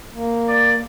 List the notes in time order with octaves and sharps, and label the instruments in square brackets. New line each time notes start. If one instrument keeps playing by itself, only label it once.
[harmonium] A#3
[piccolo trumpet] D5